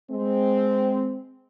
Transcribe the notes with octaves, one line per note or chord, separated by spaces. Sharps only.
G#3 C4